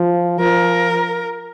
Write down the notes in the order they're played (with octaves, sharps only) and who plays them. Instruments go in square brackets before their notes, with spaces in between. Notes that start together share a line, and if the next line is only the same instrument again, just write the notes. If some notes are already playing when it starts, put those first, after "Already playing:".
Already playing: [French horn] F3
[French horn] F3 [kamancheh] A#4